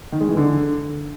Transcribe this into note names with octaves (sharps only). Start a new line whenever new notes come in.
D#3
G#3
E3
D3